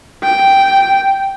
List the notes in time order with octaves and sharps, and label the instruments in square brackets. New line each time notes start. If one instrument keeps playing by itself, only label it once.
[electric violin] G5